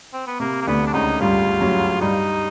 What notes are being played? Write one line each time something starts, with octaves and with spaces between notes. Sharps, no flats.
C4
B3
C3 A#3
A#3
D2 D3 B3
D4
C#2 C#3 D#4
G2 G3 F4
F#2 F#3
G2 G3 D#4